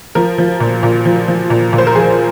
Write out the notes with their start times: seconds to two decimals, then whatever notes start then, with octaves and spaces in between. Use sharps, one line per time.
0.15 F3 A#4
0.38 F3
0.60 A#2
0.83 A#2
1.05 F3
1.28 F3
1.50 A#2
1.73 A#2
1.78 C5
1.87 A#4
1.95 F3 G#4